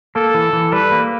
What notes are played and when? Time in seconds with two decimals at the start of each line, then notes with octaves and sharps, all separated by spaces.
0.16 A#3 A4
0.34 E3
0.53 E3
0.72 G3 B4
0.92 A#3